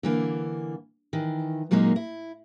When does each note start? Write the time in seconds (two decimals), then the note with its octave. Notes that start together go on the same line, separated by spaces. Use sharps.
0.03 D3 E3 A#3
1.13 D#3 E3
1.71 A#2 F#3 G#3 A#3 C#4 D#4
1.96 E4